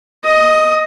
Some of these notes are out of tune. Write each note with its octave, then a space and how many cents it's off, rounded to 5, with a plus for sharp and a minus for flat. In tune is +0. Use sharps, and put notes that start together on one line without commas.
D#5 +0 D#6 +25